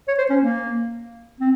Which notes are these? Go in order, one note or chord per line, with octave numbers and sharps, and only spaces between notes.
C#5
C5
C#4
A#3
C4